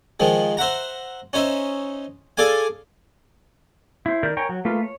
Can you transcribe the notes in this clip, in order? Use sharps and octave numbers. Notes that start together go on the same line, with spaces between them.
D#3 F3 G#3
C5 E5 F#5 A#5
C#4 D#4 C5 E5
G#4 A4 D5 F5 G#5
E4 C5
D#3 A#4 D5 G6
A#4 C#5 G5 G#5
F#3
A3 A#3 F4 B4
C#5